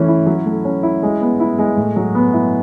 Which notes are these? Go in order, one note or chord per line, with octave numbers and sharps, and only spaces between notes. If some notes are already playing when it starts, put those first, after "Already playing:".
Already playing: E3 A3 C#4
E4
F#3
A3
C#4
E4
G#3
B3
E4
G#3
A2
F#3
B3
E4